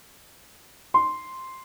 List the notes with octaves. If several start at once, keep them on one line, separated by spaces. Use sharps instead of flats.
C6